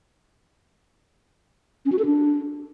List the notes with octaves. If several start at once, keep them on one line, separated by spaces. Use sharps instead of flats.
C#4
F#4
A4
D4